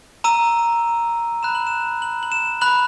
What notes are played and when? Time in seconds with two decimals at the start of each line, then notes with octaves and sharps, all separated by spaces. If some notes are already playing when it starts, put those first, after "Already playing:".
0.24 A#5 E6 D#7
1.43 B5 F#6 E7
1.55 F#7
1.67 E7
2.02 F#7
2.23 F#7
2.32 E7
2.61 B5 F#6 F#7